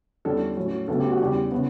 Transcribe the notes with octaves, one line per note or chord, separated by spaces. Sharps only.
E2 D3 G3 C#4 A4
A2 F#3 C#4
D2 C#3 F#3 B3 A4
G4
F#4
E2 C#3 G3 G4
C#3 E3 B3